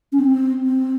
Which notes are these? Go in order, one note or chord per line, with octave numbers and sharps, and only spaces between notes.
C#4
C4
C4